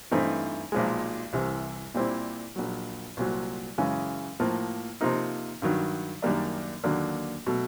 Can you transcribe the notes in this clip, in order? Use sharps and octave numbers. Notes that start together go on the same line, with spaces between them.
G2 E3 A3 C4 D#4
B1 A#2 F3 G#3
C2 C3 E3
A#2 G3 C4 E4
A#1 A#2 F#3
C2 A#2 F#3
F#2 C#3 E3 G#3 C#4
A2 F3 A#3
C3 F3 A#3 D#4
G2 D#3 F#3
F#2 D#3 G3 A#3 D4
D#2 D3 F#3 A#3 D4
B2 F#3 A3